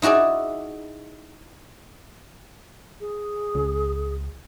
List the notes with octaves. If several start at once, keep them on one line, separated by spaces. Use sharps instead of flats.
D#4 E4 F#4 G#4 D5
G#4
C#2